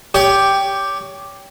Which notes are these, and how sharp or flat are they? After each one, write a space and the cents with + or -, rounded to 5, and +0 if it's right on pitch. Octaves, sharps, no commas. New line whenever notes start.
G4 +0 C#5 +30